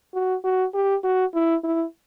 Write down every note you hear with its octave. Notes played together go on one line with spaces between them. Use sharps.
F#4
F#4
G4
F#4
E4
E4